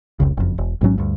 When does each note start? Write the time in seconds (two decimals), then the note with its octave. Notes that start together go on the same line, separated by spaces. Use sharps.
0.20 F1 C#2 C#3
0.37 F#1 F2
0.58 E1
0.81 A1 G#2 F#3 C#4
0.98 D2 G2